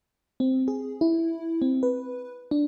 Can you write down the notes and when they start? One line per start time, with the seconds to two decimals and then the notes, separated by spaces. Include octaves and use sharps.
0.40 C4
0.68 G#4
1.01 E4
1.62 C4
1.83 B4
2.51 D4